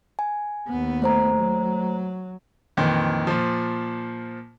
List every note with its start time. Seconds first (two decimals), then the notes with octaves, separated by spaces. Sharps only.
0.19 G#5
0.68 D#2 B3
1.02 A3 C5 A#5
1.35 F#3
2.77 F2 A#2 D#3 E3
3.27 A#2 F3